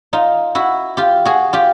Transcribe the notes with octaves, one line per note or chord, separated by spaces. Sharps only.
D#4 F4
E4 F#4
F4 G4
F#4 G#4
F4 G4